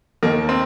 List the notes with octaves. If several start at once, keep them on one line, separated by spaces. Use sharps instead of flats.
D#2 D#3 A#3
C4